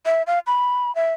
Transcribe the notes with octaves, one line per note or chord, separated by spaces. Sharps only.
E5
F5
B5
E5